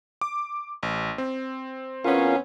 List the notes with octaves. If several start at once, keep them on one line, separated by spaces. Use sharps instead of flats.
D6
A1
C4
E2 B3 C#4 F4 A#4 F5